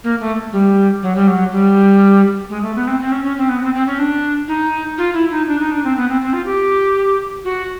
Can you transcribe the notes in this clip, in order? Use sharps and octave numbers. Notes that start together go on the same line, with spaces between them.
A#3
A3
G3
F#3
G3
F#3
G3
G#3
A3
B3
C4
C4
C#4
C#4
C4
B3
C4
C4
C#4
D4
D#4
F4
E4
D#4
D4
D#4
D4
C4
B3
C4
C4
F4
G4
F#4